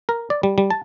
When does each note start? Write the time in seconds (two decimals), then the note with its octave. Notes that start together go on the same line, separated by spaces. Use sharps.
0.09 A#4
0.30 D5
0.43 G3
0.58 G3
0.70 A5